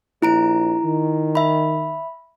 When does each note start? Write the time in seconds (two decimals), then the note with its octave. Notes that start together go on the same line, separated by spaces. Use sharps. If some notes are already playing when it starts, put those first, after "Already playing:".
0.22 A#1 E4 A#5 D7
0.84 D#3
1.35 E5 B5